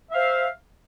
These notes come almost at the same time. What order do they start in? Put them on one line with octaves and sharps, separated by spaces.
E5 F5 C5